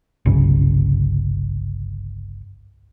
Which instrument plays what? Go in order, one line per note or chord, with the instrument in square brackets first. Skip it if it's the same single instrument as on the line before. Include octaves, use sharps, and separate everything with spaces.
[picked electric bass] G1 C2 F#2 C#3